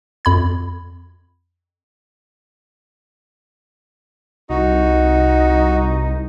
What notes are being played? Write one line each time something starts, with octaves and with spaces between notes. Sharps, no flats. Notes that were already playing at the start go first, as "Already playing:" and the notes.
F2 B5 G#6
C2 D#4 F#4